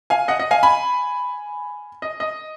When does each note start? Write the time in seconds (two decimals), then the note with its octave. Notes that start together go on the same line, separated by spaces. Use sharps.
0.10 F5 G#5
0.28 D#5 F#5
0.40 D#5
0.51 F5 G#5
0.63 G#5 B5
2.02 D#5
2.20 D#5